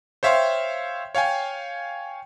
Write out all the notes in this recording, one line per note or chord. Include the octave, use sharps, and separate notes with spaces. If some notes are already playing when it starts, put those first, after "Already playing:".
C5 C#5 E5 F5 G5 C6
C#5 F5 G5 G#5